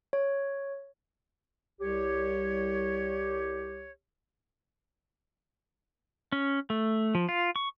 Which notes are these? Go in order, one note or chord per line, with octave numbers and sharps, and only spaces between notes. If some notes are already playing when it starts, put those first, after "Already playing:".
C#5
C2 G4 C#5
C#4
A3
F3
F4
C#6